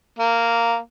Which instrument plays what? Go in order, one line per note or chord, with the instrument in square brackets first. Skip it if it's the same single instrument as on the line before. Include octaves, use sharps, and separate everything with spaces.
[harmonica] A#3